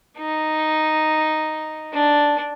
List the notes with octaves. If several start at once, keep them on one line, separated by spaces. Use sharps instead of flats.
D#4
D4